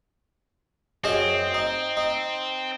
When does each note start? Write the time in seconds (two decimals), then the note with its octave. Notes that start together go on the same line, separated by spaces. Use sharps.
1.04 F#2 C4 G#4 D#5
1.54 D#4
1.97 D#4